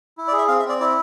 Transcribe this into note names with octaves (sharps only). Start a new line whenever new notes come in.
E4
D5
G#4
E5
C4 F5
E5
C4 D5
E4 D5